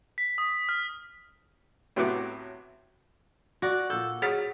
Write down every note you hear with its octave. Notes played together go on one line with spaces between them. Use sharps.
B6
D#6
F6
A2 C3 F#3 B3 F#4 D6
F#4 D5 A#6
A#2 A4 G6
F#3 G#4 F#5 F6 A6 B6